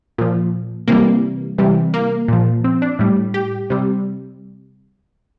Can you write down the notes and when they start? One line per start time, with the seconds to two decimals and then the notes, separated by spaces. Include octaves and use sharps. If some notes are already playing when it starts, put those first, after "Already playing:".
0.18 A#2 F3
0.88 C3 E3 G3 A#3
1.58 C3 E3 G3
1.94 A#3
2.28 A#2 F3
2.64 C4
2.82 D4
2.99 A2 G3
3.34 G4
3.70 C3 G3